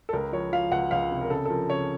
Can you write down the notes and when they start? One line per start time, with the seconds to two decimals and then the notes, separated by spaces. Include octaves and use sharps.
0.09 A4
0.13 C#2 A#4
0.33 F3 C#5
0.52 F3 F5
0.71 C#2 F#5
0.91 C#2 F5
1.11 C3
1.21 A#4
1.30 C#3 A4
1.45 A4
1.50 F3 A#4
1.69 C#3 C#5